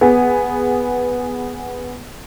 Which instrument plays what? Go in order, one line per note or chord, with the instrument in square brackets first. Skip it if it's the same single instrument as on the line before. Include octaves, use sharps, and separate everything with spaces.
[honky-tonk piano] B3 G#4